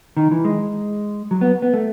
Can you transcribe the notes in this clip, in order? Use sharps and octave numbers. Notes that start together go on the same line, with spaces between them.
D#3
E3
G#3
F#3
B3
B3
A3